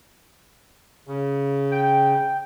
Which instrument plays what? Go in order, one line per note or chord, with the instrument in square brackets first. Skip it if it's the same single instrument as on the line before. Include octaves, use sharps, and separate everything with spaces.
[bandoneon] C#3
[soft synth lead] G5